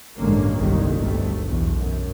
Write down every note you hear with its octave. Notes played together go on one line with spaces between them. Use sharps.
A1 G2 D3 G#3 A#3 C#4
G1 C2 D#3
G1 D2 A3
B1 E2
F#2